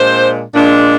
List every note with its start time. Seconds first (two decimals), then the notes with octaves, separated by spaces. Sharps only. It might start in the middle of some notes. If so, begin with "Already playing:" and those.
Already playing: A#2 G#3 D4 C5
0.55 A#2 G#3 D4